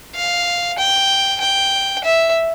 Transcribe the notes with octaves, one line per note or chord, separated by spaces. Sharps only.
F5
G5
G5
E5